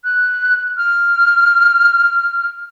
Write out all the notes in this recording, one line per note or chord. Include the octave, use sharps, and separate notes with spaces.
F#6
F6